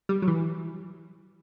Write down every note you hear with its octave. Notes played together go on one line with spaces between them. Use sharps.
G3
F#3
E3